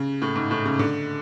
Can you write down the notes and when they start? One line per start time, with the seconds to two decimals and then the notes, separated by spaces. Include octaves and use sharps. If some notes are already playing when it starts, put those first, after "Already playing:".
Already playing: C#3
0.22 A2
0.36 G#2
0.51 A2
0.65 C#3
0.79 D3